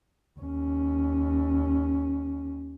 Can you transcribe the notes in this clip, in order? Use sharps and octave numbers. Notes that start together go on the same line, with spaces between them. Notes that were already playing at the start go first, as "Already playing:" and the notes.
D#2 C#4